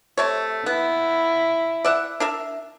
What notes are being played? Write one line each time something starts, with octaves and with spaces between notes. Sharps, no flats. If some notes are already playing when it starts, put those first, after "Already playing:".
C3 A3 C#5
B3 E4
D5 E5 F#5
D4 A#4 E5